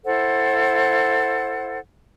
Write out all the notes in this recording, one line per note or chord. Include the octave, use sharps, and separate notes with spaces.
E4 A4 C5 F#5